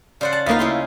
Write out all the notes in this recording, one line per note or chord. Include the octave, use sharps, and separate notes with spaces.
C#3 C5 D5 F#5
A5
D2 A#3 B3 D#4 F4 F5
C#3 E4 G#4 C6